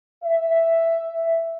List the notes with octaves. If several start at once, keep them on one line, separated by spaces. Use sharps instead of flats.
E5